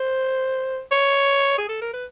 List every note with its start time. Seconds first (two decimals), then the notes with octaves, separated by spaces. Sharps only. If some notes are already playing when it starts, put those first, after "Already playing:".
Already playing: C5
0.91 C#5
1.58 G#4
1.69 A4
1.81 A#4
1.93 B4